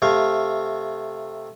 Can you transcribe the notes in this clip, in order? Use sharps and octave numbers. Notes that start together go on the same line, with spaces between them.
C3 A3 F5